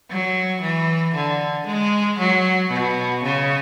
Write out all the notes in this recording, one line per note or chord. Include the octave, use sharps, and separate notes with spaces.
F#3
E3
D3
G#3
F#3
B2
C#3